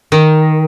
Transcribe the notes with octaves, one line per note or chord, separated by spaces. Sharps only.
D#3